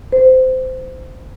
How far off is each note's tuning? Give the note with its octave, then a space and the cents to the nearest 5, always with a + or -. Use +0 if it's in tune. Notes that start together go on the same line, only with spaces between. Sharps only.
C5 -20